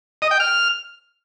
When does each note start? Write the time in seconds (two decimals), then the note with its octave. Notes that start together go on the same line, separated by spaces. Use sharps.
0.22 D#5
0.31 G5
0.40 F6